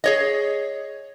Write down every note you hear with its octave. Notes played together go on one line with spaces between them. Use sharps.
G#4 C#5 D#5